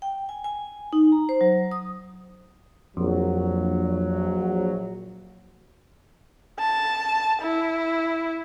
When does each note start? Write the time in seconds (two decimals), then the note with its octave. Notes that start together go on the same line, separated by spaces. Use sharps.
0.02 G5
0.29 G#5
0.44 G#5
0.93 D#4
1.12 A#5
1.29 C5
1.41 F#3
1.72 D#6
2.97 A#1 F2 F#3
6.59 A5
7.42 E4